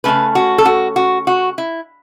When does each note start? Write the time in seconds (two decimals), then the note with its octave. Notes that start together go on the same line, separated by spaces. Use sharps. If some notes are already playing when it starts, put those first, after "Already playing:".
0.04 C#3 A3 C#4 B4
0.35 F#4
0.58 A4
0.65 F#4
0.96 F#4
1.27 F#4
1.58 E4